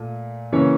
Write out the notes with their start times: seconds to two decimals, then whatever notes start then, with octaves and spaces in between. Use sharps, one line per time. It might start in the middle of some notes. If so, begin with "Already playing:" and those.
Already playing: A#2 A3
0.52 C#3 E3 A#3 C#4 C#5